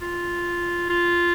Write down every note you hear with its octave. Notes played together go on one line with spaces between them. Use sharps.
F4
F4